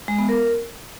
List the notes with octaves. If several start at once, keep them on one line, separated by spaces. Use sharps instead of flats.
G#3
B3
A#4